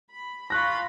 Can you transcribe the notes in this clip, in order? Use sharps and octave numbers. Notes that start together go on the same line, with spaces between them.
B5
F4 B5 C#6 F#6 A#6